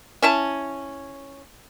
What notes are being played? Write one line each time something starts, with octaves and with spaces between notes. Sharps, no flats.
C#4 E4 A5